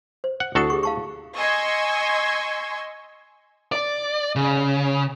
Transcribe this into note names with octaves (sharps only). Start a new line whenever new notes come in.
C5
F#5
D2 E4 F#4 A4 F#5 D#6
G4 G#4 C#6
F5 A5 C#6
D#5 G#5 C6 C#6 E6 G#6
D5
C#3